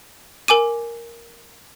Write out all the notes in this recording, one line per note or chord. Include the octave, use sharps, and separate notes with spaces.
A#4 G#5 D6 D#7